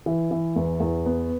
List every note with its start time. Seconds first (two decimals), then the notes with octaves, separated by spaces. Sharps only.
0.06 E3
0.31 E3
0.56 E2
0.80 E2
1.06 B3